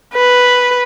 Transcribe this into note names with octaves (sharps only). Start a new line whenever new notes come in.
B4